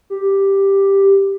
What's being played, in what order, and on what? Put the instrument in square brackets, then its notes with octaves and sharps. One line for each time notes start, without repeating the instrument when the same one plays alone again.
[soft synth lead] G4